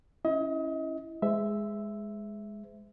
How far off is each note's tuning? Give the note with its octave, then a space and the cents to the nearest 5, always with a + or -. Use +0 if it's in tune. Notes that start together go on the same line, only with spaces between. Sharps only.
C#4 +0 E4 +0 D#5 +35
G#3 +0 C5 -40 E5 +0